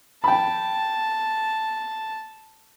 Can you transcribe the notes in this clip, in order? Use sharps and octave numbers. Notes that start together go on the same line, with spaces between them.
G5 A5 B5